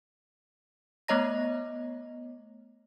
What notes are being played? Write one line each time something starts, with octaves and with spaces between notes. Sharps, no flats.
A3 B3 C#5 D#5 A#5 A#6